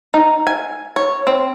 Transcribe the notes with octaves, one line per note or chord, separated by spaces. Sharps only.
D#4
G#5
C#5
C4